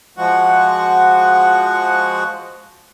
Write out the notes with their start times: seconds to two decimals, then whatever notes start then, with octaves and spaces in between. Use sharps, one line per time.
0.18 F3 G#3 F#4 F#5 C#6